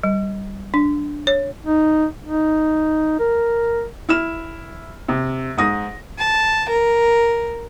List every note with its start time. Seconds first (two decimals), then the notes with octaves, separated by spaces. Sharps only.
0.04 G3
0.74 D4
1.27 C#5
1.66 D#4
2.24 D#4
3.20 A#4
4.09 E4 F6 E7
5.08 C3
5.58 G#2 D#6 A#6
6.18 A5
6.69 A#4